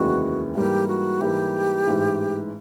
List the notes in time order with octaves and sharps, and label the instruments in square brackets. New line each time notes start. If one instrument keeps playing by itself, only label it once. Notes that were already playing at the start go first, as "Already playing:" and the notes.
Already playing: [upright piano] F1 D#2 C#3 E3 G#3 [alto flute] F#4
[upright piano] G#2 E3 G3 A#3 [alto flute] G4
[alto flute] F#4
[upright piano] G#2 E3 G3 A#3 [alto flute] G4
[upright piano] A1 G#2 E3 G#3